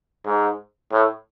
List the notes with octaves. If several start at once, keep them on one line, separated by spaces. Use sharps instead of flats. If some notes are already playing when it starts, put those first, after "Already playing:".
G#2
A2